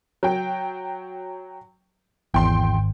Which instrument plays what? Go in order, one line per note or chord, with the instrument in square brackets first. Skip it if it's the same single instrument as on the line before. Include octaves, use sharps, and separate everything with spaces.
[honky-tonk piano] F#3 G5
[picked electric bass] G#1 [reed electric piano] E2 [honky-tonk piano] G5 C6